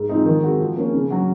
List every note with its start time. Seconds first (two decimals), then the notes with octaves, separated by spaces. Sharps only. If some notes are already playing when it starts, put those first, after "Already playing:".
Already playing: G#2
0.09 F3 G#3 C4 D#4
0.26 D#3
0.43 G#3 C4 F#4
0.60 F3
0.77 A#3 C#4
0.94 C#3
1.10 F#3 C#4 F#4